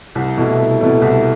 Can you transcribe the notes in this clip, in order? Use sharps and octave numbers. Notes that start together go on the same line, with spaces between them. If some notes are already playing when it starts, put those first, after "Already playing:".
C2
B2 A3 E4
C2
B2 A3 E4
C2